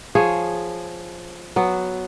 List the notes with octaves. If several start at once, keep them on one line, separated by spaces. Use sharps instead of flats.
F3 G#4 C#5
F#3 B3